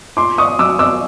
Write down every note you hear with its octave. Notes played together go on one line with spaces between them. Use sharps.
A#2 C6 D6
C#6 D#6
F#3 D6 E6
D6 E6